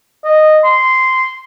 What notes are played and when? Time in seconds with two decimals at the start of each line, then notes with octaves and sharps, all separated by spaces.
0.24 D#5
0.64 C6